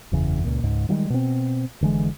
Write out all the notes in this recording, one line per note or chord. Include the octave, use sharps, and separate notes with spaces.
F#1 E2 C#3
C#2 A#2
C#2 G#2
D#3 F3 G3 G#3
B2 C4
F1 D3 E3 G#3